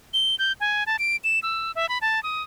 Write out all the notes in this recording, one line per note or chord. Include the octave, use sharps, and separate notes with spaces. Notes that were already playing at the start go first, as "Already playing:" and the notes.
G7
G6
G#5
A5
D7
E7
E6
E5
B5
A5
D#6